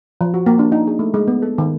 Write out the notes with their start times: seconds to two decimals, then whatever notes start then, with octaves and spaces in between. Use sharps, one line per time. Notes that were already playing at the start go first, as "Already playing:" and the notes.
0.21 F3
0.34 F#4
0.46 A#3
0.59 D4
0.72 D#4
0.87 G#4
0.99 A3
1.14 G#3
1.28 B3
1.42 A4
1.58 D#3